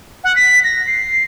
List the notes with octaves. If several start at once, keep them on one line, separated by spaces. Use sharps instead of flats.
F#5
B6
A#6
C7